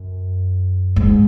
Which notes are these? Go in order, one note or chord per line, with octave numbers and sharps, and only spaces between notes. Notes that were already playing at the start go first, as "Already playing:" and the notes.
Already playing: F#2
G#2